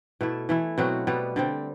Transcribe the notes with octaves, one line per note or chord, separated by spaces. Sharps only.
B2 A3 E4 A4
E3 A3 E4
B2 F#3 C4 F#4
B2 G3 B3
D3 G3 C4